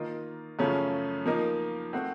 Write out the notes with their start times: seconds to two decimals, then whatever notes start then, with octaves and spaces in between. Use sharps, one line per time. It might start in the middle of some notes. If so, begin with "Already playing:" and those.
Already playing: D#3 A#3 F4 A#4 D#5
0.59 F#2 C#3 F3 A3 C#4
1.26 F3 A#3 D#4 A#4
1.93 A3 C4 F#4 C5